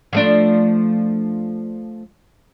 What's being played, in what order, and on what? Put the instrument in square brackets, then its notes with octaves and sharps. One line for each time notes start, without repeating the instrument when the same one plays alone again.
[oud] F3 A3 D4